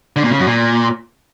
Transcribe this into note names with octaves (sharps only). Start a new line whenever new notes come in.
D3
A#2
C#3
F#2
A#2